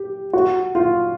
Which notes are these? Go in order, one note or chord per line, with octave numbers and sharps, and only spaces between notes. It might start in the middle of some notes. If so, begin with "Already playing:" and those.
Already playing: G4
F#4
F4